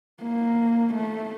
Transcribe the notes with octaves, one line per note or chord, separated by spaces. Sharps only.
A#3
A3